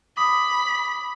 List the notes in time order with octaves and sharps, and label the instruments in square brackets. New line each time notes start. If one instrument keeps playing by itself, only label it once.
[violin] B5 [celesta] D6 D#6